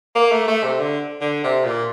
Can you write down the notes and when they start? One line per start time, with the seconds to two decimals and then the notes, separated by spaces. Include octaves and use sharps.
0.15 A#3
0.32 A3
0.48 A3
0.64 C3
0.80 D3
1.21 D3
1.44 C3
1.65 A#2